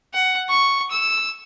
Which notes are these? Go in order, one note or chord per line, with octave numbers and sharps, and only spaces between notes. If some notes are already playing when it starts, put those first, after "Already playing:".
F#5
C#6
E6